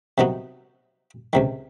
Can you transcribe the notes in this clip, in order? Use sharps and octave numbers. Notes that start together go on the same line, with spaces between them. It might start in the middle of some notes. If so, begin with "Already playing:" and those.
C3 D#3 F#3 B3
C#2 C3 D#3